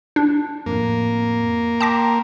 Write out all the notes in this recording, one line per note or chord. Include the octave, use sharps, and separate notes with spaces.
D4
F2 A2 A#3
G5 A5 A#5 C6 D6 A#6